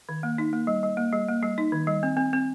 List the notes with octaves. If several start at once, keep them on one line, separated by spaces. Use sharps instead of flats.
D#3
A#3
D#4
A#3
G3
G3
A#3
G3
A#3
G3
D#4
D#3
G3
C4
C4
C4